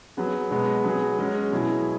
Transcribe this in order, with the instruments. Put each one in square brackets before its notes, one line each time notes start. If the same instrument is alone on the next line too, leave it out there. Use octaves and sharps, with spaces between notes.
[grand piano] F#3 B3 G#4
B2 G#3 B3
F#3 B3 G#4
G#3 C#4 F#4
B2 F#3 E4 G#4